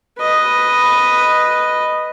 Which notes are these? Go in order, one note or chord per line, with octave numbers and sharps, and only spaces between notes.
B4 D#5